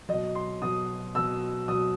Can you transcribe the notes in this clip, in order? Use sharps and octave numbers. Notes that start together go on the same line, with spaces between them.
B2 F#3 D#5
C6
B2 F#3 D#6
B2 F#3 E6
B2 F#3 D#6